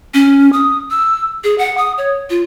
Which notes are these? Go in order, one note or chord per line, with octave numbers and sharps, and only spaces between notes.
C#4
D#6
E6
G#4
F#5
D#6
C#5
F4